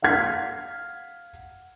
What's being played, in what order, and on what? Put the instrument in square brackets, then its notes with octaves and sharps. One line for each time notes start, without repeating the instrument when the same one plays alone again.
[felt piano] F5 F#5 F6 G#6 B6 C7